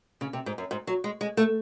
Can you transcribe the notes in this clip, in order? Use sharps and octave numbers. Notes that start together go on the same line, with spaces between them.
C#3
C3
G#2
F#2
G#2
F#3
G#3
G#3
A3